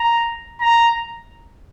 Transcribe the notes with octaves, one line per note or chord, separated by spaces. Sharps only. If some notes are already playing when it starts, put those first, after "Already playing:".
Already playing: A#5
A#5